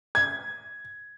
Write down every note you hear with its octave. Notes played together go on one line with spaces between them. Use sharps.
G#6